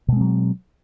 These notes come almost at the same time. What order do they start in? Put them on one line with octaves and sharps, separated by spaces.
B2 G#3 C4 F#3